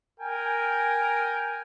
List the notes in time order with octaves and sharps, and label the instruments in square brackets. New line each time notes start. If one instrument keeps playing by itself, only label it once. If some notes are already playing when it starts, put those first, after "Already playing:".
[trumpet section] A#4 G5 G#5